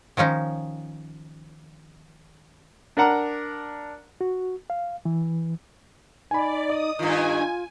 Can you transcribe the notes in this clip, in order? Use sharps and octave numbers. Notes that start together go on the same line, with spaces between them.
D#3 F3 C#4 D#4
D4 A#4 F#5 A#5
F#4
F5
E3
D#4 D5 G#5 B5
D#5 D#6
G2 D#3 F4 G#5